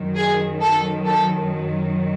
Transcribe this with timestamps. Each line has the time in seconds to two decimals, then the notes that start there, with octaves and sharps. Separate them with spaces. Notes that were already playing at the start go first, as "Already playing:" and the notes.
Already playing: F#2 D#3 F#3
0.16 G#4
0.62 A4
1.07 A4